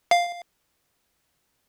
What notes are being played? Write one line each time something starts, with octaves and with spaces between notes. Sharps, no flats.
F5